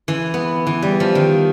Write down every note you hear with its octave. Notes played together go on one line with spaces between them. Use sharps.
E3
B3
E3
G3
F3
D#3